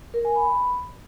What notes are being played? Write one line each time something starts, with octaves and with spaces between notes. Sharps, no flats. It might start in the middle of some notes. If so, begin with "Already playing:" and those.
A#4
G#5
B5